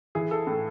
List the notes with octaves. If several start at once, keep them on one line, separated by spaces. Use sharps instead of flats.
E3 G#4
A4
A2